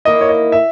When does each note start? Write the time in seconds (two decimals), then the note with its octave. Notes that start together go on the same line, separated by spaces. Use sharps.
0.05 E2 D#3 A#3 E4 D#5
0.21 C#5
0.29 D#5
0.52 E5